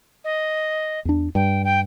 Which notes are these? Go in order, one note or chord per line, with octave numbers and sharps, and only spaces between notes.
D#5
E2 D4
G2 G5
G5